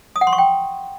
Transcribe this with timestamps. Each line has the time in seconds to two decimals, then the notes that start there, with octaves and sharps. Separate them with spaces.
0.16 D#6
0.21 F#5
0.27 C6
0.33 C#6
0.38 G5